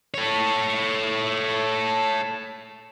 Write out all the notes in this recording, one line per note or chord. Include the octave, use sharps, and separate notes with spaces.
A4 C#5